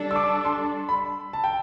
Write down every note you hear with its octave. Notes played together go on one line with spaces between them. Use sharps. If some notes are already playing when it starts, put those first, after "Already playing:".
Already playing: G3 D4 A4
E6
D6
C6
B5
A5
G5